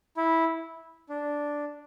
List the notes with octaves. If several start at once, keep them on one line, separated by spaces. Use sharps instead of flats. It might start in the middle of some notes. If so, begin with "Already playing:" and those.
E4
D4